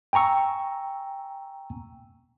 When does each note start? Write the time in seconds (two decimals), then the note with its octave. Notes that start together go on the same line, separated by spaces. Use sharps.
0.13 G5 G#5 A#5 C#6 E6